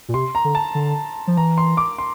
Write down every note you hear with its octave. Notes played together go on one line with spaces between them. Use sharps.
A#2
C3 C6
A#5
D3
A5
D3
F3
E3 A#5
C6
D6
C6